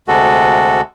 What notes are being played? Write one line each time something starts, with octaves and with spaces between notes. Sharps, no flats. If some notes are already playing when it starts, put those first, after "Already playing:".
D2 C3 G#3 F#4 A4